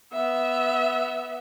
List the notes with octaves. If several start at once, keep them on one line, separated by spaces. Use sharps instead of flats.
B3 E5